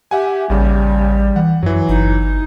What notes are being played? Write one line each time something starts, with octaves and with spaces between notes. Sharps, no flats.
G4 E5 F#5 G#5
A1 D#2 C#3 G3
E3 F#5
F#2 E3 F#3
G1 D#4